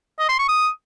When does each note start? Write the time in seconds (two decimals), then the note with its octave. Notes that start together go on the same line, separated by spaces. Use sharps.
0.19 D#5
0.29 C6
0.39 C#6
0.48 D#6